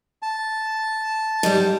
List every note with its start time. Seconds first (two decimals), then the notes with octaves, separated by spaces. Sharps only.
0.22 A5
1.43 G#2 G3